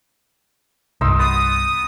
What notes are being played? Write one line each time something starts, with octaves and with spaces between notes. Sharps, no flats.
C2 G2 D#4 C6 E6
B3 D#6